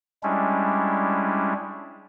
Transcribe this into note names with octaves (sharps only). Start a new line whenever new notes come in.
G3 G#3 C#4 D4 E4